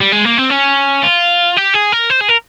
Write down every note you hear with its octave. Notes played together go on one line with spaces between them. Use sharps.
G3
G#3
A#3
C4
C#4
F4
G4
G#4
A#4
C5
G#4
A#4